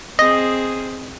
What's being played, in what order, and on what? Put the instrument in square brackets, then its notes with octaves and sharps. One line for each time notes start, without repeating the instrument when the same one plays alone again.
[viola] C4 G#4 [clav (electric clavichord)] D#5